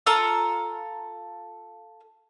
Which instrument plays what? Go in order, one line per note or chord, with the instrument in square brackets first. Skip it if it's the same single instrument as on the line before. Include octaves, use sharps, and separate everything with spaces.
[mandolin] F4 A4 A#5 E6